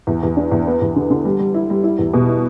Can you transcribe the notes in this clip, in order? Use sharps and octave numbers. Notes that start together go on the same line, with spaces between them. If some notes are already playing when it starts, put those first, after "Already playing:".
E2
E2
D4
E2
B3
E2
D3
D3
G3
G3
E4
G3
E4
E2
B2
E4